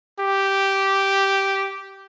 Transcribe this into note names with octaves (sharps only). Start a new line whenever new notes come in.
G4